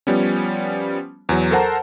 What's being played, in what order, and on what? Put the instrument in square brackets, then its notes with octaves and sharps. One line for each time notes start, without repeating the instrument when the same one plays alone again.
[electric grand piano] F3 G3 B3 C#4
E2 F#3
A4 A#4 C5 F#5 A5 A#5